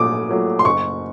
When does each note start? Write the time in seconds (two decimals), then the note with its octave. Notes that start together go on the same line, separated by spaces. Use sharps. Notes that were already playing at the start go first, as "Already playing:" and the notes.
Already playing: A#1 A#2 F#3 A3 D6 D#6
0.29 A#2 F#3 A3
0.59 C6
0.65 F#1 C#6